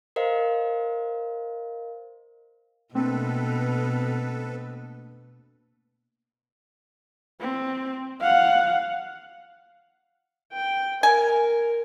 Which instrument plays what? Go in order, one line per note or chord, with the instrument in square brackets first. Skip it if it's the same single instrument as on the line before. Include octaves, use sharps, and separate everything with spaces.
[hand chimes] A#4 C5 D#5 F5
[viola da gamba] B2 [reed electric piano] A3 A#3 D4 [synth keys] C4 [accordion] A4 B4
[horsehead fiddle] C4
F5 F#5
[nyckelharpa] G5
[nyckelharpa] A#4 [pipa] G#5